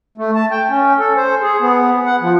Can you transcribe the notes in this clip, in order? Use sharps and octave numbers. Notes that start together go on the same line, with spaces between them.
A3
A5
G5
C#4
A4
C5
G#4
B3
F#5
F3